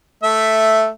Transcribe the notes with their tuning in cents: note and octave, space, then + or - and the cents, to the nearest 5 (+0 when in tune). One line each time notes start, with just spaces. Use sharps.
A3 +0 E5 +0